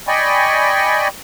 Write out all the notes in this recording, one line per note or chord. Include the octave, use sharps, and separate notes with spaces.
D5 D#5 G5 G#5 B5 C#6